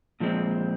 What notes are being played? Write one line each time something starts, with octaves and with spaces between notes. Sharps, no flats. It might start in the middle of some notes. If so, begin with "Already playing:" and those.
A#2 F3 G#3 C4